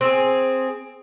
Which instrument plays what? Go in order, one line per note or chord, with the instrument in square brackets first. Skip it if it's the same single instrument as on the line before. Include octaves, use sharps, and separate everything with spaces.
[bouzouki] C4 G#4